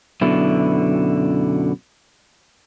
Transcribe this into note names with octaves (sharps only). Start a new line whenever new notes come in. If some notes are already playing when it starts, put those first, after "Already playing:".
F#2 B2 D3 E4